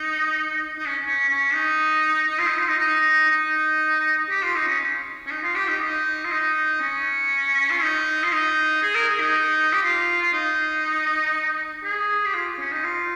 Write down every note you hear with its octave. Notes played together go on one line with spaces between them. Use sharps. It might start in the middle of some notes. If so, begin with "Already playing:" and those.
Already playing: D#4
D#4
C#4
C#4
C#4
D#4
D#4
F4
D#4
F4
D#4
D#4
D#4
G4
F4
D#4
C#4
C#4
D#4
F4
G4
D#4
D#4
F4
D#4
C#4
F4
D#4
F4
D#4
G#4
A#4
G#4
D#4
G4
F4
F4
D#4
G#4
G4
F4
C#4
D#4
F4